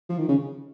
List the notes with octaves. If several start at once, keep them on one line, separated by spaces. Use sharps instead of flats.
F3
D#3
C#3